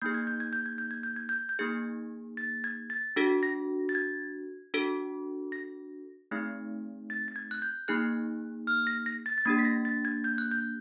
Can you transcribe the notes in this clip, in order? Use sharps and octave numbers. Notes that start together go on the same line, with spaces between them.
A#3 D#4 G#4 G6
G#6
G6
G#6
G6
G#6
G6
G#6
G6
G#6
G6
G6
A#3 D#4 G#4 G#6
A6
G#6
A6
D4 F#4 A4 A#6
A#6
A6
G#6
D4 F#4 A4
A#6
A3 C4 D#4 G#4
A6
A6
G#6
F#6
G6
A#3 D#4 G#4 F#6
F6
A#6
A#6
A6
A6
A#3 D4 G4 G#6
B6
A#6
A6
G#6
G6
F#6
G6